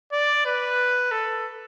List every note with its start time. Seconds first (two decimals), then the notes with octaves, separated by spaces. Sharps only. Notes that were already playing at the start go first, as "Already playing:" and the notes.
0.12 D5
0.46 B4
1.12 A4